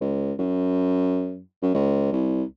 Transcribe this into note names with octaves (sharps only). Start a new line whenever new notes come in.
C#2
F#2
F#2
C#2
C2